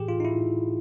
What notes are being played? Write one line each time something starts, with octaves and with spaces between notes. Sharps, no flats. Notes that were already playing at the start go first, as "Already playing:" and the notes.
Already playing: A2 E3 G4 G#4
F4
D#4
E4